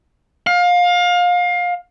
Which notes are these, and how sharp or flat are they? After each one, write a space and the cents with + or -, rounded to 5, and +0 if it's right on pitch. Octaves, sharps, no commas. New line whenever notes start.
F5 +25